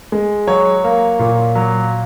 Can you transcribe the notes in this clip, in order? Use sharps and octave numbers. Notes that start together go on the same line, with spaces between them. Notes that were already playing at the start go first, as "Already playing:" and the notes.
G#3
F#3 C#5
A#3
A#2
F#3